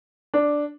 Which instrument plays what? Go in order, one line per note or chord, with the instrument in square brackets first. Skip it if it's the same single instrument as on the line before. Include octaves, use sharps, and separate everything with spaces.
[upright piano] D4